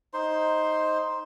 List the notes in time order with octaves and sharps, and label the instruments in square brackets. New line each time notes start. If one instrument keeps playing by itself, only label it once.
[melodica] D#4 C5 C6